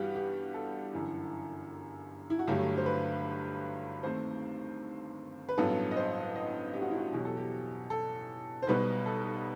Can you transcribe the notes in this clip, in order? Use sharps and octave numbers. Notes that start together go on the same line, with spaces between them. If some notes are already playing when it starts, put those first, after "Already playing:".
Already playing: G2 E3 G3 B3 F#4 G4
G4
A4
G1 F#2 E3
E4
F#4
G1 G2 F#3 A3 G4
C5
B4
D#2 D#3 A3 C4 C5
B4
A1 G2 F#3 B3 A4
D#5
C5
D#5
G4
F#4
E4
F#4
E2 B2 F#3 G4
A4
G4
A4
C5
B1 B2 G3 B3 B4
A4